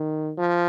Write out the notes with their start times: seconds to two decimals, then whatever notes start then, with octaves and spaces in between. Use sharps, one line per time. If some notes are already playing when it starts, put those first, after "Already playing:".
Already playing: D#3
0.38 F3